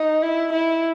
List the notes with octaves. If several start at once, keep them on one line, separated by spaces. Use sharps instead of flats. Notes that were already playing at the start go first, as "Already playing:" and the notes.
Already playing: D#4
E4
E4